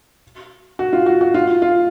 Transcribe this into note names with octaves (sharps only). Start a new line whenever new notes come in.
F#4
F4
F#4
F#4
F4
F4